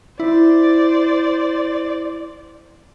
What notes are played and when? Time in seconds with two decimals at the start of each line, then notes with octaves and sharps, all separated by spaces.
0.20 E4 C5 D5